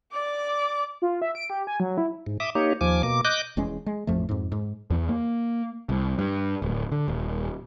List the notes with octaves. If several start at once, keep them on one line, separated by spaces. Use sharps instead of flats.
D5 D6
F4
E5
D7
G4
G#5
F#3
E4
G#2
E5 D6 D#6
A#3 D#4 G4 C#5
D#2 F3 G#5 D6
B2 A#3 D6
D#5 D6 F#6 G6
E1 E2 G#3 C#4
G#3
A1 F2 F3 A3
F2 G#2
G#2
E2
A#3
C2
G2
D1
D3
D#1